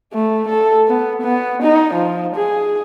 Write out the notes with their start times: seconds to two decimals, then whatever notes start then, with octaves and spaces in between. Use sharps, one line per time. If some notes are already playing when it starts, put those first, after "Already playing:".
0.13 A3
0.48 A4
0.88 B3
1.22 B3
1.62 D#4
1.94 F3
2.36 G#4